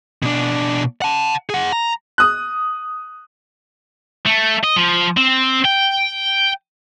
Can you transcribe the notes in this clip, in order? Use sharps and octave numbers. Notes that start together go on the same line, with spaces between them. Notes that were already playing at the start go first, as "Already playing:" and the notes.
B2 D4
F#5 A5
G#4 F#5
A#5
D#6 F#6
A3
D#5
F3
C4
G5